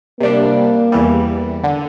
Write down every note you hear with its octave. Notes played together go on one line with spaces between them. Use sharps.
C3 G3 A#3 D4
E2 E3 G3
D3